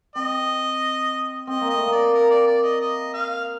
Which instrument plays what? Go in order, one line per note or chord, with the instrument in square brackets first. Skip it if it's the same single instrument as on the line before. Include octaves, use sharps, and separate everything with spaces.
[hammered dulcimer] C4 [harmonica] D#5
[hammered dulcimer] C4 [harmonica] D#5
[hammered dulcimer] A#3
[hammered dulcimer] A3 [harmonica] D#5
[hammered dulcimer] A#3 [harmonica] D5
[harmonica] A#4
D5
D5
D#5
D#5
F5